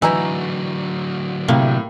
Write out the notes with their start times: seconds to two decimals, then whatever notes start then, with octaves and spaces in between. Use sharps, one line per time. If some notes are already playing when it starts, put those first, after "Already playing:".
0.02 D3 E3 F#3 D#4 E4 A#5 E6
1.48 A2 C3 A#3